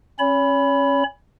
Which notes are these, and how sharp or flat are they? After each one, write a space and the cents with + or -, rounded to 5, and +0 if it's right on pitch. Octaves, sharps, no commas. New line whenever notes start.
C#4 -20 C#5 +35 B5 +0